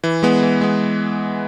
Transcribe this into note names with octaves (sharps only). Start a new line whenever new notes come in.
E3
G#3 B3
E3
G#3 B3